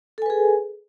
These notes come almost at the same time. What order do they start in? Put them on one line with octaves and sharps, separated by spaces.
A4 G#5 B4 G#4